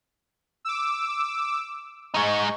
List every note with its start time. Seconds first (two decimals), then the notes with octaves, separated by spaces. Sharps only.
0.65 D6 E6
2.14 G#3 D#4 C#6